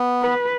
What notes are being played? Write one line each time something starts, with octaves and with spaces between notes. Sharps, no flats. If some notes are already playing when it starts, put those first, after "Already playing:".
Already playing: B3
B4